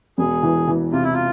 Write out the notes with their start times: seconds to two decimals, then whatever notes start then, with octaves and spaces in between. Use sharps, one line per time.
0.18 E1 G#4
0.43 E3
0.68 E3
0.92 C3 F4
1.03 E4
1.14 F4